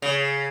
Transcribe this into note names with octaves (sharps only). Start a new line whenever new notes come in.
C#3